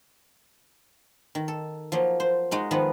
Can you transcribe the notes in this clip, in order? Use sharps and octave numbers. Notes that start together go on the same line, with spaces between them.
D#3
A4
F3 F#3 A#3
C5
G#3 D#4 F#4
D#3 F3 B3 B4 F#5